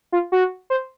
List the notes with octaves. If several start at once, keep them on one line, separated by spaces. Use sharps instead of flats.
F4
F#4
C5